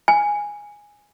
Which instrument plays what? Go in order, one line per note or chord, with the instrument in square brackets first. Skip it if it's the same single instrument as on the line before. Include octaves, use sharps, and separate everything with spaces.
[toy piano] G#5